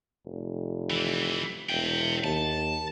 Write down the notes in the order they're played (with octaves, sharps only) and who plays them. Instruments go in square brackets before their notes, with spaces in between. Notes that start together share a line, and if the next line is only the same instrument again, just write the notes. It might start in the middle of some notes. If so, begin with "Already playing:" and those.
[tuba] F1
[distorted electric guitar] E3 C4
[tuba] E1 [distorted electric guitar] E5 G5
[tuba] D#2 [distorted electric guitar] A5